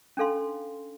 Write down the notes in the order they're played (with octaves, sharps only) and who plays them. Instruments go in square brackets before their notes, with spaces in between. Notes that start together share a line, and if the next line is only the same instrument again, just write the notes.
[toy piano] C#4 D4 A4 F5 C6